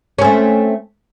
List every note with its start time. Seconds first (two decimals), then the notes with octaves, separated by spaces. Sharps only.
0.18 C#4
0.21 C4
0.24 A3